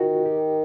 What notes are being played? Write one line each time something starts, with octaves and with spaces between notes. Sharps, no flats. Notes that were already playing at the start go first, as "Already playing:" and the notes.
Already playing: D#3 F4 F#4
G4